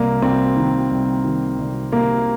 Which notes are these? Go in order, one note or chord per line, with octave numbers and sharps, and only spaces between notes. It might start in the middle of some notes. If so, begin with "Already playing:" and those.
Already playing: C2 A#3
C2 C4
D#3
C2
D#3
C2
C3 A#3